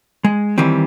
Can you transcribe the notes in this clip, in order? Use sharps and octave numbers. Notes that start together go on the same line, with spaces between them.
G#3
D#3 E3 G3 C4